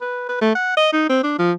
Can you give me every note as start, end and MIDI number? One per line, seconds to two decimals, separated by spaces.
0.01 0.26 71
0.29 0.37 71
0.41 0.53 57
0.55 0.75 78
0.77 0.92 75
0.93 1.04 63
1.09 1.22 60
1.23 1.35 62
1.39 1.53 53